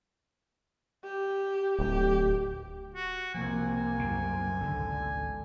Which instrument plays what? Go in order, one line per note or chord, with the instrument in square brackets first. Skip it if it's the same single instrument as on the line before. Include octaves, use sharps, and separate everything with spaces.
[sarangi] G4
[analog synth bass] D1 [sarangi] G4
[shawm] F#4
[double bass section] C2 C3 A#3 [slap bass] F3 [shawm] G#5
[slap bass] F#2 A2 C#3
[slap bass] G#1 C#2 [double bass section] D3